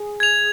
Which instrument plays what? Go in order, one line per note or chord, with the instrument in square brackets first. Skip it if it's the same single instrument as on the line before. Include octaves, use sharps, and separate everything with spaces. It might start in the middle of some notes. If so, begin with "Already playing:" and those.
Already playing: [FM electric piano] G#4
[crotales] G#6 F7